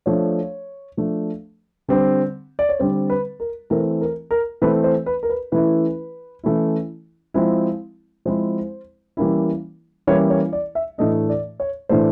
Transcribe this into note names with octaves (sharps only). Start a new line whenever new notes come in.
F3 A3 D4 C#5
F3 A3 D4
D3 G3 C4
D5
C#5
D3 G3 C4 C5
B4
A#4
E3 A3 C4 A#4
A#4
A#4
E3 A3 C4 B4
C5
B4
A#4
B4
E3 A3 C#4 E4 B4
E3 A3 C#4 E4
F3 G#3 C4 E4
F3 G#3 C4 E4 C5
E3 G3 A#3 C#4 E4
E3 G3 A#3 C#4 E4 C#5
C#5
D5
E5
A2 E3 A3 D4 D#5
D5
C#5
A2 E3 A3 D4 C5